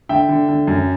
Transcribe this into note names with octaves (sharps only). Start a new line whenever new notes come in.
D3 E5 G5
D3
D3
F#2